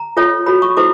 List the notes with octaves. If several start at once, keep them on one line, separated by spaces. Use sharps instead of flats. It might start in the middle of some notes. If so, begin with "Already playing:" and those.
Already playing: A#5
F4 A4 C#5
F#4 A4 C#5 B5
C#6
E4 A4 C5 D6